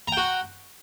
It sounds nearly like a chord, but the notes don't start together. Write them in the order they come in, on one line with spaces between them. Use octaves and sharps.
A#5 G5 F#4